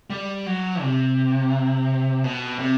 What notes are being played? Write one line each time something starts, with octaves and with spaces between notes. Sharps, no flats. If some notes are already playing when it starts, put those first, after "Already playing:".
G3
F#3
C3
B2
C3